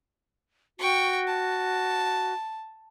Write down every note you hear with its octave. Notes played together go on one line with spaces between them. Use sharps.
F#4 G5 C#6
A5